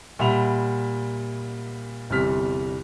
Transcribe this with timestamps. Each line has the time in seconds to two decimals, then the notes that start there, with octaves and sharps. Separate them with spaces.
0.19 A#2 G3 E5 F#5 B5 F7
2.10 G1 E2 C3 G3 F6 B6